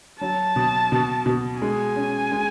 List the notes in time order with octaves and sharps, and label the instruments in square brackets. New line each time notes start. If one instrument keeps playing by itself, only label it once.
[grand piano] F#3 [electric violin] A5
[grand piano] B2
B2
B2
[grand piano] G#3 [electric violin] G#5
[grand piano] C#4
G#3